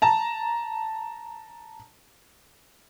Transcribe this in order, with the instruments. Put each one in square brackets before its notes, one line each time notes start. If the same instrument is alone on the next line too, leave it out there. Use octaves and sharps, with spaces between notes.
[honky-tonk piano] A5 A#5